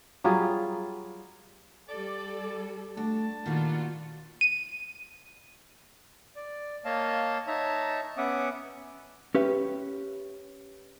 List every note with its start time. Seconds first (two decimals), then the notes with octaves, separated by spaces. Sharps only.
0.24 F#3 G3 F4 G#4
1.89 G3 A4 D5
2.97 A3 D4 F#4 A5
3.46 A#2 D#3 G3 F4 F#4
4.41 D#7
6.36 D5
6.85 A#3 C#5 D#5 F5 A5
7.47 D#4 C#5 E5 A5 A#5
8.18 B3 C#4 E5 F#5 D6 D#6
9.35 C#4 G4 B4 E5